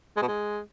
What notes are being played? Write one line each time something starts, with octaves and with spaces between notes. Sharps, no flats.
G#3
B2
G#3